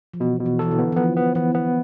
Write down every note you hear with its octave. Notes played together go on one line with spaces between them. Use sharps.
F3
B2 E3
B2
E3
E3 A4
D3
B3
E3
F3 B3
B3
E3 B3
B3